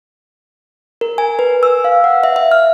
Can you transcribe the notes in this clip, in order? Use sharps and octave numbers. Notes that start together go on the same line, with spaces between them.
A#4
G#5
B4
E6
F5
F#5
E5
E5
F6